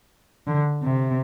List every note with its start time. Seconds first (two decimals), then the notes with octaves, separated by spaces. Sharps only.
0.47 D3
0.83 C3